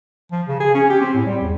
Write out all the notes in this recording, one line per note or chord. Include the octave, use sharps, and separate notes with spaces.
F3
C#3
G#4
C#4
G4
C4
A2
G3
E2